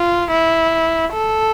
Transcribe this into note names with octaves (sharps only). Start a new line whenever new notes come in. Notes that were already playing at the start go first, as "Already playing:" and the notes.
Already playing: F4
E4
A4